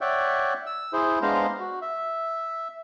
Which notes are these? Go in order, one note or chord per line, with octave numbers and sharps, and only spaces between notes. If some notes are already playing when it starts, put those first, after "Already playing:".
C#5 D5 E5 F#5 G5
E6
E4 G#4 C5
G#3 B3 D4 C5 F5 A#5
F#4
E5